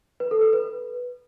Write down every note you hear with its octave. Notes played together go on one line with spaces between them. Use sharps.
B4
A4
B4
B4